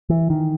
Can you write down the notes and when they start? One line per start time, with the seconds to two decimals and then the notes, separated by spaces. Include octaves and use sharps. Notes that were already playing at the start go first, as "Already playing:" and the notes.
0.10 E3
0.30 D#3